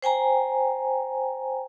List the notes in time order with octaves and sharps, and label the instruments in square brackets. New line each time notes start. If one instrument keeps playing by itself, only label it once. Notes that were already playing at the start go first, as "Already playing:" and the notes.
[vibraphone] C5 G5 G#5 A#5